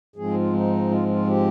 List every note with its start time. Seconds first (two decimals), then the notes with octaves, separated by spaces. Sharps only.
0.16 G#2 F3 G#3 C4 G#4
0.34 F4
0.53 D#4
0.90 F4
1.08 F4
1.27 G4